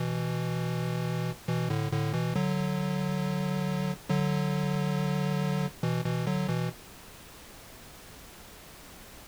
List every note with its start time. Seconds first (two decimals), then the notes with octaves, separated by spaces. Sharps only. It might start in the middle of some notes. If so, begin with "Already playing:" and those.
Already playing: B2 E3
1.48 B2 E3
1.70 A2 D3
1.92 A2 D3
2.14 B2 E3
2.36 D3 F#3
4.09 D3 F#3
5.83 B2 E3
6.05 B2 E3
6.27 D3 F#3
6.49 B2 E3